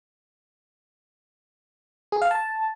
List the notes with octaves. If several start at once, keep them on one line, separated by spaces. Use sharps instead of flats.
G#4
F5
A5